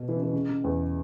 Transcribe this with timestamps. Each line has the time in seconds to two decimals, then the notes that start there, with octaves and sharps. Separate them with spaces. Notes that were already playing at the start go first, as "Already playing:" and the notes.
Already playing: B2
0.08 E3
0.16 C#3
0.23 E3
0.33 C#3
0.49 C#3
0.64 E2